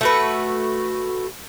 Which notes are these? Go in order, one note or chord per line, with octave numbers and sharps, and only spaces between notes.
A3 F#4 B4